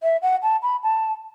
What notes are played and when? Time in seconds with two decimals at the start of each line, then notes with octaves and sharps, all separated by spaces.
0.03 E5
0.22 F#5
0.43 A5
0.62 B5
0.83 A5